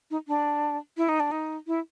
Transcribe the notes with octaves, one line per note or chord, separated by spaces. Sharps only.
D#4
D4
E4
D#4
D4
D#4
E4